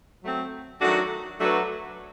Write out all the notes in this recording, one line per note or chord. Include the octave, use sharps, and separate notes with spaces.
F#3 A3 C4
D#3 F#3 A3 D4 F#4
F#3 A3 D4 F#4 B4